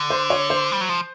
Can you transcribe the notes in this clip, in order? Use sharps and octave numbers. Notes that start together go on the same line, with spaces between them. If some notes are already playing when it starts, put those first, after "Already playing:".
Already playing: D3
C5
C#5
C5
G3
F#3
F3